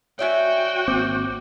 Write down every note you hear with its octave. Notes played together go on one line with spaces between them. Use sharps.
F#4 C#5 D5 E5 G5 G#5
G#1 A#3 C4 D6 G6